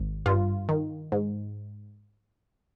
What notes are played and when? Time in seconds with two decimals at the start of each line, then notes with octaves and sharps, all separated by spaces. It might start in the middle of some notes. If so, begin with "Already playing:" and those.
Already playing: G#1
0.26 G2 F4
0.69 D#3
1.12 G#2